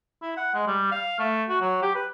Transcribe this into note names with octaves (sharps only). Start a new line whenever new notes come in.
E4
F#5
G#3
G3
F5
A3
F#4
F#3
G4
B4